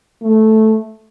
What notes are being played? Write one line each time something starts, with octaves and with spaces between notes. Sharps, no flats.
A3